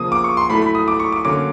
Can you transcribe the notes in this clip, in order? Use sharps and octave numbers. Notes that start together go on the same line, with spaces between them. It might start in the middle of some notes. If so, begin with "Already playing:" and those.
Already playing: C#3 F3 A#3 D#6
D6
C#6
C6
A2 F#3 A3 B5
B5
D#6
D6
C#6
D6
D3 F#3 A#3 C#4 D6